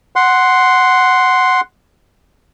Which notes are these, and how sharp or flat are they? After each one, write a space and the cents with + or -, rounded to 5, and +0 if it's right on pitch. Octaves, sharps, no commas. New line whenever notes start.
F#5 +0 C6 +0